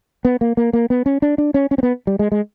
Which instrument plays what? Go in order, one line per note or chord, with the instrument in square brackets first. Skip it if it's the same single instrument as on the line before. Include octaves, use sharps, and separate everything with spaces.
[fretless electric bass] B3
A#3
A#3
A#3
B3
C#4
D4
D4
C#4
C#4
C4
B3
G3
G#3
G#3